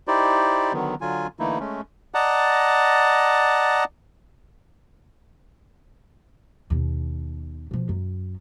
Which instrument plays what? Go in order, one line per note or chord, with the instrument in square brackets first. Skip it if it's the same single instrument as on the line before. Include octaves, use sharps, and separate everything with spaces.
[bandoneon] D#4 E4 G4 C5 D5
D3 D#3 F#3 B3
D3 F#3 F4 G#5
D3 E3 A3 A#3 D#4 E4
G#3 A3 C#4
[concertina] D5 D#5 F#5 A5 A#5
[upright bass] D#2 B2
B2 F3
F#2